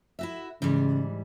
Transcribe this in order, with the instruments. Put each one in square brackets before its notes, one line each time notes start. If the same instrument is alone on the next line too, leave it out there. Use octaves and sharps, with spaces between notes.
[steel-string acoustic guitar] E4 F#4 E5
[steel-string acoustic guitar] G#2 E3 G3 [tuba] C#3